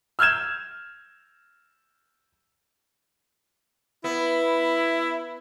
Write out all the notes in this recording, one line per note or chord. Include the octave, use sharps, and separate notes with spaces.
E6 F6 G6 G#6 E7
B3 E4